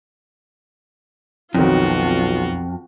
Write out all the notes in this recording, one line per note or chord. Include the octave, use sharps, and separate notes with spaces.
B1 F2 D#3 F#3 C4 F4 F#4